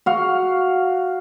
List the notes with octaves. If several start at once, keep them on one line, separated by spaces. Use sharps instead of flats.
F#4 F5